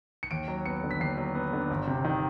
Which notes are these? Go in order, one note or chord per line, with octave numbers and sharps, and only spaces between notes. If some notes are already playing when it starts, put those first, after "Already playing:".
C#7
D#2 D7
F#3
B3 C#7
D3
B6
D#2 C7
F#3
B3
D3
G1
C3
D#3